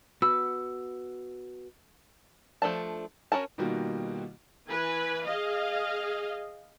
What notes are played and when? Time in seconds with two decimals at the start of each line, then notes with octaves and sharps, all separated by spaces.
0.22 B3 F#4 B4 E6
2.62 F3 A3 D4 A5
3.32 C#4 F#4 A#4 A5
3.58 B2 D#3 G3 A#3 F4 F#4
4.69 E3 B4 G#5
5.25 G#4 D#5 F5